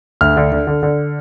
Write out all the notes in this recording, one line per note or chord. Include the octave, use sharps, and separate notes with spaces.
D2 F6
D3
D3
D3
D3